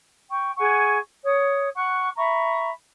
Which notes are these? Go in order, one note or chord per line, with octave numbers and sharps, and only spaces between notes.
G5 C#6
G#4 F#5 G#5 C#6
C#5 D#6
F#5 C#6 F#6
E5 A#5 B5 C#6